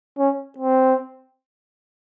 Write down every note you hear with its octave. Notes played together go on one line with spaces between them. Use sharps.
C#4
C4